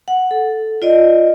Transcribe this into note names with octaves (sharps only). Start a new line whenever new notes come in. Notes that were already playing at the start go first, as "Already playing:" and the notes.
F#5
A4
F4 D5 D#5